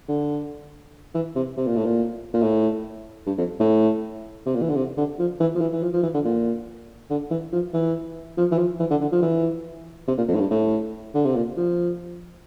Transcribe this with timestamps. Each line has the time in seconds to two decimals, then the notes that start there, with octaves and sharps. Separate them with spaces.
0.08 D3
1.14 E3
1.35 C3
1.57 C3
1.67 A#2
1.76 A2
1.85 A#2
2.34 A#2
2.42 A2
3.27 G2
3.38 F2
3.60 A2
4.46 C3
4.55 A#2
4.62 E3
4.70 D3
4.76 C3
4.97 D3
5.19 F3
5.40 E3
5.55 F3
5.60 E3
5.73 E3
5.83 F3
5.93 F3
6.03 E3
6.14 D3
6.25 A#2
7.10 D3
7.31 E3
7.53 F3
7.74 E3
8.38 F3
8.51 E3
8.58 F3
8.80 E3
8.90 D3
9.01 D3
9.12 F3
9.22 E3
10.08 C3
10.18 A#2
10.28 F2
10.35 A2
10.40 G2
10.51 A2
11.14 D3
11.25 C3
11.35 A#2
11.57 F3